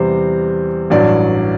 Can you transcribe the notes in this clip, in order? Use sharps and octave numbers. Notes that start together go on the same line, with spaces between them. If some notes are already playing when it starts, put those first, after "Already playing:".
Already playing: E2 C3 G3 C5
A1 G2 F#3 D5